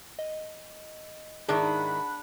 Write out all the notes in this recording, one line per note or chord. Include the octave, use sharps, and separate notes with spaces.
D#5
G#2 D#3 D4 E4 G#4 F#5 B5